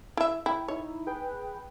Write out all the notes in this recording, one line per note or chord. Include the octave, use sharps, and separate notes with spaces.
E4 E5
E4 G5
D#4 E4 C#5
G#4 B4 G5